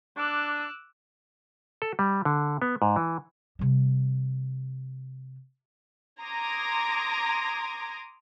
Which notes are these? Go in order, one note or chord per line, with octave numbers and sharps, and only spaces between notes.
D4 D6 E6 F#6
A4
G3
D3
B3
G#2
E3
C3 G3
A#5 C6 D6 D#6 G#6 A#6